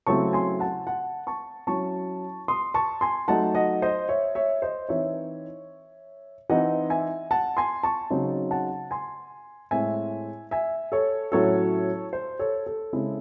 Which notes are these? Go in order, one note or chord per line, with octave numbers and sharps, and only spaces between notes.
C#3 F#3 A3 C4 E4 A5 C#6
G#5 C6
F#5 A5
F#5 A5
A5 C#6
F#3 C#4 E4 A5 C#6
C6 D#6
A5 C#6
G#5 C6
F#3 A3 D#4 F#5 A5
D#5 F#5
C5 D#5
C#5 E5
C#5 E5
C5 D#5
E3 C4 D#4 C#5 E5
E3 C4 D#4 D#5 F#5
E5 G#5
F#5 A5
G#5 C6
A5 C#6
C#3 F#3 C4 D#4
F#5 A5
G#5 C6
A2 G#3 C4 E5 G#5
E5 G#5
A4 C#5
A2 F#3 C#4 E4 A4 C#5
C5
A4 C#5
A4
C#3 G#3 C4 E4